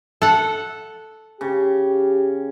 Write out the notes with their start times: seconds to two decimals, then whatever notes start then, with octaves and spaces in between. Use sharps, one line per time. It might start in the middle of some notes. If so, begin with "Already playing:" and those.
0.22 A4 F#5
1.41 C#3 G4